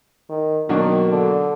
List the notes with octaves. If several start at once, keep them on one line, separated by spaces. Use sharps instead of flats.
D#3
B2 D#3 F#3 A#3 D4 F#4
D3